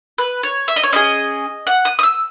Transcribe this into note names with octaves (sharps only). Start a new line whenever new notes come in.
B4
C#5
E5
D#5
C#5
C#4 E4 G#4 D#5
F#5
D#6
D#6
E6